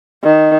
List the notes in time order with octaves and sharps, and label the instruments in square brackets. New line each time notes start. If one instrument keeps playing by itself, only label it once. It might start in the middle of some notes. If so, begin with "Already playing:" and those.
[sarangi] D#3